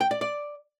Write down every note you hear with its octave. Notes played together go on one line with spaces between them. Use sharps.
G5
D5
D5